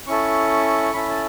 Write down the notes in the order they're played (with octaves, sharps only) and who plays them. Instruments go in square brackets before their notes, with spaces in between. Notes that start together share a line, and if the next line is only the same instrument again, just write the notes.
[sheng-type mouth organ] C#4 E4 A4 C#6
C#4 E4 A4 B5
A5